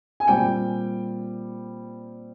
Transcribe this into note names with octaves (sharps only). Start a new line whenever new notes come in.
G#5
A#2 G3 C4 G5